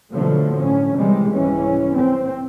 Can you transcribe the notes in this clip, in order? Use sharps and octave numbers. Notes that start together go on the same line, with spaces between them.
B2 D3 F3 F#3 A3
A2 C#4
C3 E3 G3 G#3
C2 G#2 E3 C#4
C4